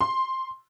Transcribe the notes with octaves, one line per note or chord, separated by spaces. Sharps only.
C6